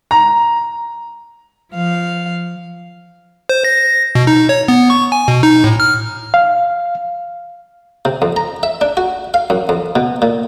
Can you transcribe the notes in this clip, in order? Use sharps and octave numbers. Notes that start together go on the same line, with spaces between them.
A#5
F3 F5
C5
A#6
B2
D#4
C#5
B3
C#6
G#5
B2
D#4
A2
F6
F5
C3
F2
A#5
E5
D4
F#4
F5
F#2
F2
B2
A#2